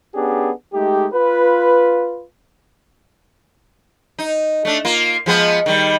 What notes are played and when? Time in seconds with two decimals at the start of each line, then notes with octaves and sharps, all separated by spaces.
0.15 B3 C#4 D4 G4 G#4
0.73 G#3 A3 D#4 G4
1.13 F4 B4
4.19 D#4
4.65 A3 D4
4.85 A#3 F4
5.26 F3 G#3 B3
5.66 D#3 G3